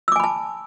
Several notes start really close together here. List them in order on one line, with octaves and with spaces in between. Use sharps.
E6 D6 G#5 B5 A5